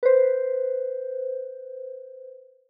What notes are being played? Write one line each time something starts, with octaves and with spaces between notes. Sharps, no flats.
B4 C5